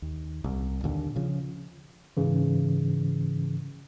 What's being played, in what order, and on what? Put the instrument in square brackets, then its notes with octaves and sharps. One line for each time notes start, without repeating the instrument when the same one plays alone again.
[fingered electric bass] D#2
C2
D#2 A#2 D3
C#3 F3
[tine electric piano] G#2 C#3 E3